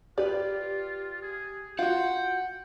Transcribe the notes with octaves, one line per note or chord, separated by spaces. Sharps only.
F4 G4 B4 D5
G#4
F4 F#4 F#5 G5